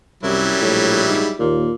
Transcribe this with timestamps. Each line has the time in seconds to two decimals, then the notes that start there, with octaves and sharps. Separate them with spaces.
0.23 C2 F#2 F#3 G3 E4
0.62 A#1 A2
1.08 G#2
1.39 D#2 A#2